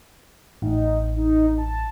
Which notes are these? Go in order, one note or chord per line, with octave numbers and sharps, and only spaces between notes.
A1 D#4
D#4
A5